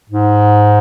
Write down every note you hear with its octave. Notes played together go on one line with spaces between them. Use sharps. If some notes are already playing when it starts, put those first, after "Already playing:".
G#2